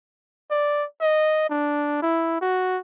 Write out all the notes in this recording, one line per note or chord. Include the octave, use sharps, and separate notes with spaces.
D5
D#5
D4
E4
F#4